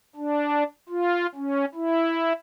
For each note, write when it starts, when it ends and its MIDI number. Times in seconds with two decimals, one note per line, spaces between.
0.16 0.63 62
0.89 1.26 65
1.35 1.65 61
1.74 2.33 64